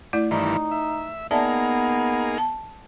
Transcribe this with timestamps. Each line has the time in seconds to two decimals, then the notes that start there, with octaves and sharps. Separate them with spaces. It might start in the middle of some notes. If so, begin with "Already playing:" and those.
0.13 A3 E4 D5
0.31 G2 D#3 E3 D#4 D5
0.71 E5
1.31 A#3 B3 D#4 G#4 D5 E5 A5
2.38 A5